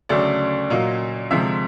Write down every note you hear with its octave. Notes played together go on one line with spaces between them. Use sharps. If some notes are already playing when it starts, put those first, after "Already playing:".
D2 C#3 F#3 A3 D5
A#2 F#3 A#3 D#5
D2 C3 F3 G#3 E5